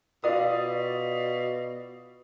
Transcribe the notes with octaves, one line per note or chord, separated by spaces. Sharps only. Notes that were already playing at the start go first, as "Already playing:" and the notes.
B2 F4 D5 D#6